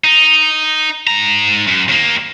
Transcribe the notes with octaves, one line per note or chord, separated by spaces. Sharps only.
D#4
G#2 A#5
F#2
D#2 A#3